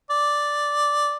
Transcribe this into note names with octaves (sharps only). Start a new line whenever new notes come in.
D5